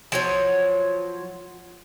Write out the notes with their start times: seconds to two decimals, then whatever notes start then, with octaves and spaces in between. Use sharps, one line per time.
0.12 F3 F#3 C#5